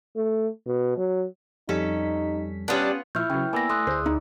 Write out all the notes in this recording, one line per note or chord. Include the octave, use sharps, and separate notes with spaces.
A3
B2
F#3
F2 G3 C#4 D#4 A4 B6
G3 B3 C#4 D4 F4 C#5 D#6 F#6
A#2 F3 E4 C#5 C#6 F6 G6
C#3 F#3 B4 C#5 G5
A#3 B3 D5 G#5 B5 E6 A#6
A3 C6 D#6 F#6
D2 G#4 C5
D#4